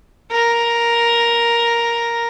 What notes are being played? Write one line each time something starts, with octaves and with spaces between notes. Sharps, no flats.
A#4